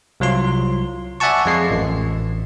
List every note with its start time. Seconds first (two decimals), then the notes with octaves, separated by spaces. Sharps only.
0.20 C2 F#3 F4 C6
1.20 D5 E5 F#5 G#5 A5 C#6
1.46 F2 G#3 C7
1.70 A1